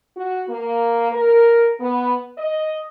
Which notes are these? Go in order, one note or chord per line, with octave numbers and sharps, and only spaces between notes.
F#4
A#3
A#4
B3
D#5